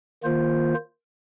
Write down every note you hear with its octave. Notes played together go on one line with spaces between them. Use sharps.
D#3 A#3 F4 C5